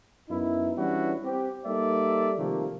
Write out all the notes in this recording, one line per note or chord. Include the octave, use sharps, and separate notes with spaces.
F#2 B3 D#4 E4
E3 G3 C#4 D4 E4 F#4
C4 G4
G3 A#3 D#4 A4 D5 E5
C3 D#3 F3 G3 A3 A#3